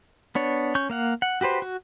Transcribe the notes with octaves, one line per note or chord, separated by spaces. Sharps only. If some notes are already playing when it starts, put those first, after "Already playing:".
B3 D4 C#5
C#4 C#6 G6
A#3 F5 F#5
F#5
F#4 G4 B4 C5
F#4